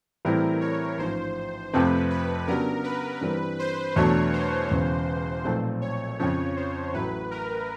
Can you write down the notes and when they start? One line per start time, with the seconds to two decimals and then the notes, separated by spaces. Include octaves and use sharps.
0.25 A2 E3 G3 C4 E4 A#4
0.61 C#5
0.98 A1 G#2 F3 C5
1.73 F2 C3 F3 A3 C4 B4
2.10 B4
2.47 C#3 F#3 B3 D4 G4 A#4
2.84 B4
3.21 G2 E3 G3 C4
3.59 C5
3.96 E2 B2 F#3 A3 D4 C#5
4.33 C5
4.71 E1 E2 C#3
5.45 B1 A#2 F3 A3 C4
5.81 C#5
6.20 F2 C#3 F3 C#5
6.57 C5
6.93 A1 A2 F#3 B4
7.31 A#4